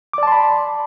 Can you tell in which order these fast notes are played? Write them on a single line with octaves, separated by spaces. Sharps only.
D6 D5 A5 C6 B5